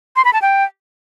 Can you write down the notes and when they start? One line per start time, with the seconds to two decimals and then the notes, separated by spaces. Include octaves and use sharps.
0.16 C6
0.25 B5
0.33 A5
0.42 G5